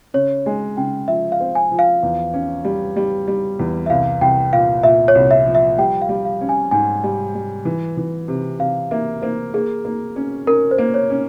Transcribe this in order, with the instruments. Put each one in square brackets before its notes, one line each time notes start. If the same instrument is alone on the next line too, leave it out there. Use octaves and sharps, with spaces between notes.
[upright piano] C#3 [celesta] C#5
[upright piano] G#3 [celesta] G#5
[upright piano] C#3 [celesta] G5
[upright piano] F3 [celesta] E5
[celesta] F5
[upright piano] C4
[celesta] G#5
[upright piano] F3
[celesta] F5
[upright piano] E2
C#4
G3
G3
G3
E2
[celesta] E5
[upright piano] C2 [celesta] F5
[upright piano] C2 [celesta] G5
[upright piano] A#2 [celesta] F5
[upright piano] A#2 [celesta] E5
[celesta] C#5
[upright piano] C2
[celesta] E5
[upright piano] F3
[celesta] E5
[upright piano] G3 [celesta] G5
[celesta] F5
[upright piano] G3
[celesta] F5
[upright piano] C#4
[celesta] G#5
[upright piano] G#2 [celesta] G#5
[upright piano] G3
G3
E3
E3
C3
[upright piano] C3 [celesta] F5
[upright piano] A#3 [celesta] E5
[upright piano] A#3 [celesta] C5
[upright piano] A#3 [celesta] G#4
[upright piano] A#3
C#4
[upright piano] C#4 [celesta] A#4
[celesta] C5
[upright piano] A#3
[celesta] C#5
[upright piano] C#4